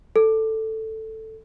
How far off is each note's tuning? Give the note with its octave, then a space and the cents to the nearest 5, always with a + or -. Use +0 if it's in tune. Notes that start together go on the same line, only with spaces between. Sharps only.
A4 +5